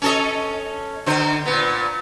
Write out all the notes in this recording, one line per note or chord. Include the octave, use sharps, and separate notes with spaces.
C#4 A4 D#5
D3 C5
A#2 B3